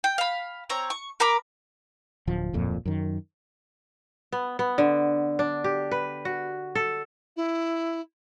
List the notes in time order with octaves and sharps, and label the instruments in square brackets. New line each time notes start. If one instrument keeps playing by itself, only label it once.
[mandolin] G5
F5 B5
C4 C#5 A#5
C#6
A#4 A#5 B5 D6
[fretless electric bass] D1 F3
D1 F2 A#2
F#2 D#3
[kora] B3
B3
D3
D4
G4
B4
F#4
A4
[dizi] E4